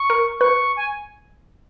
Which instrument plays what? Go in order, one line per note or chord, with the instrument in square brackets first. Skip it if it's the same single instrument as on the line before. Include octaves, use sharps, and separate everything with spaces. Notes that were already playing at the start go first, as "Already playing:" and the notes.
Already playing: [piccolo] C#6
[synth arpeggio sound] A#4
[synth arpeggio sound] B4 [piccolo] C#6
[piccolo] G#5